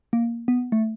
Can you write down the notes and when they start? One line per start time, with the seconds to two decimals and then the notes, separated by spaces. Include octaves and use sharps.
0.13 A#3
0.48 B3
0.72 A3